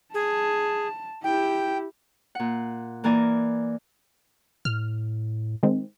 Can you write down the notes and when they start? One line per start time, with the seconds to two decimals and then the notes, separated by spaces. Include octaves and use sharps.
0.14 G#4 A5
1.24 E4 G4 G5
2.35 A#2 F#5
3.04 E3 A#3 A#4 D5 G#5
4.65 A2 F6
5.63 D#3 G#3 C4